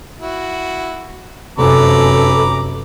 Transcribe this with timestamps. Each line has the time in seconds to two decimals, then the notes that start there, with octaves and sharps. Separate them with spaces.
0.21 E4 F#4
1.58 F1 F#2 A4 B4 A#5 D6